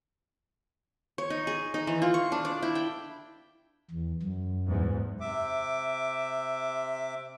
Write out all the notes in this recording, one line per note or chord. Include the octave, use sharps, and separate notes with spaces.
C#5
D#4
G#4
D#4
E3
F4
C#6
D4
D5
E4
G5
E2
F#2
E2 G#2
C3 E5 D6